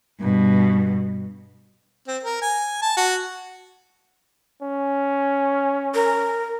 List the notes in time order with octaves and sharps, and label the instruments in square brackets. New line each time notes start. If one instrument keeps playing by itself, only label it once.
[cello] G2 B2
[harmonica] C4
A#4
G#5
A5
F#4
[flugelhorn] C#4
[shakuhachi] A#4